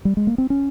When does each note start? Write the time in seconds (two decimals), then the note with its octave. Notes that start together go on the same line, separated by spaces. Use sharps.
0.05 G3
0.17 G#3
0.27 A#3
0.38 C4
0.50 C#4